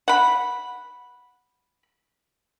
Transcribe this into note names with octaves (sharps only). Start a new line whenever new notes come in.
F#5 B5